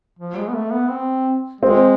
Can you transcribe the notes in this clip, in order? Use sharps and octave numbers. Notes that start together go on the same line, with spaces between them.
F3
G#3
B3
A3
B3
C4
G#3 C4